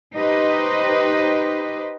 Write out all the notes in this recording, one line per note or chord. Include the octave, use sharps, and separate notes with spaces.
D#4 G4 B4 C5 D#5